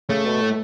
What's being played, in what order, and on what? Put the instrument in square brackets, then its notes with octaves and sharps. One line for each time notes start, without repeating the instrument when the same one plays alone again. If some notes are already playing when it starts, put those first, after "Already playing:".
[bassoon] C#3 [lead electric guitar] A3
[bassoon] B2
A2